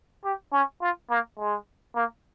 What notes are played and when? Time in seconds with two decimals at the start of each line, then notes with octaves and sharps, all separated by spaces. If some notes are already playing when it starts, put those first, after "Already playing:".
0.24 G4
0.53 C#4
0.81 F4
1.10 A#3
1.38 G#3
1.95 A#3